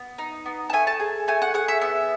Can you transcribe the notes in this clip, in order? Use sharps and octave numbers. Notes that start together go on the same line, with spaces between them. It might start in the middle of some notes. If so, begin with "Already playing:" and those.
Already playing: B3
D#4
B3
A5
A3 G#5
A5
G#4
A3 G#5
F#5
G#4 F#5
E5
B3 E5